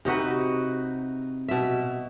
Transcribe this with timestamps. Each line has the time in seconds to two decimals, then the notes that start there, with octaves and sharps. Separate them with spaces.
0.05 C3 D#4 F#4 B4
1.48 B2 E5